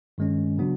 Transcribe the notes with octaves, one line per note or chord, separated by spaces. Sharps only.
G2 D#3 G#3 C#4
C#3 F#3 B3 D4 F#4